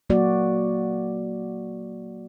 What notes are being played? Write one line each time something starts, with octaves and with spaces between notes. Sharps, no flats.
F#3 A#3 F#4 D5